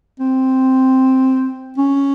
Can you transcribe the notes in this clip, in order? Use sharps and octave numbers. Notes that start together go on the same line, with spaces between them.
C4
C#4